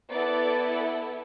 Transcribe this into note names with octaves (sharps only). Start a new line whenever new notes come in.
B3 E4 A4 D5